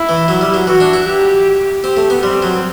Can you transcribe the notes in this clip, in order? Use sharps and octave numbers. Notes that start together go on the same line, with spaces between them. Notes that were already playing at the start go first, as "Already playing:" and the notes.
Already playing: E4
E3
F#3
G3
F#3
E3 F#4
D4
E4
G4
C4 G4
A3
B3
G3 C4
F#3